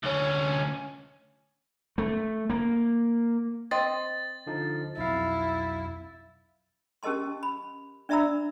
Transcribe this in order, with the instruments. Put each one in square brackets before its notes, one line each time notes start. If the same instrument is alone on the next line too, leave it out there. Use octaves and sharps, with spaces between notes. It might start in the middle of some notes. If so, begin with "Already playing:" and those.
[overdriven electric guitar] D2 C#4
[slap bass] A3
A#3
[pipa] C4 D#5 [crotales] A6
[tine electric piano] D3 F3 D#4
[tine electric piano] B1 F2 F5 [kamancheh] E4
[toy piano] C#4 G4 A#4 D#5 A5 C6
B5
D4 D5 E5 A#5 B5 E6